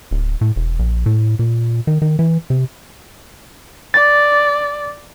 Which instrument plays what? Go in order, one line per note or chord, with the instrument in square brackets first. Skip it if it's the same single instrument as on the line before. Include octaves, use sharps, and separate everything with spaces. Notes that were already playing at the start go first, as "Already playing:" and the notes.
[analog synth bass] D1
A2
E1
A#1
A2
A#2
D#3
D#3
E3
C3
[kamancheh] D5 [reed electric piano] A6